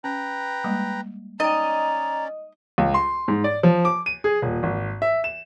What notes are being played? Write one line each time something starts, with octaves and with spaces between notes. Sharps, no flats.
C#4 B4 G5 A#5
G3 G#3 A#3
C#4 D#4 D5 D#5 G5 A#5
C#2
C6
G#2
D5
F3
D6
D#7
G#4
D#1
G#1
E5
E7